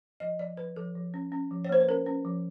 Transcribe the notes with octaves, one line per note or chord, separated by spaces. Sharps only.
F3 D#5
F3 D5
F3 B4
F3 A4
F3
C#4
C#4
F3
C#5
A#3 C5
B4
C#4 A#4
C#4
F3